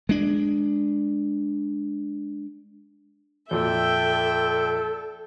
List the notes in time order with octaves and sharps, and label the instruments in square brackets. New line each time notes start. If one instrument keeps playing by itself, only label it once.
[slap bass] G#3 D4
[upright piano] F2 A#2 [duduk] A4 [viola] E5 G5